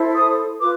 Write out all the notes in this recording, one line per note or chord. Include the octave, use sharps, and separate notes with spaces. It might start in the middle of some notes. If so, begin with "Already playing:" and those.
Already playing: E4 A4 C5
D#6
F4 B4 D6